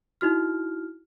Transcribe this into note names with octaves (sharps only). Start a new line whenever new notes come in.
D#4 E4 F#4 F6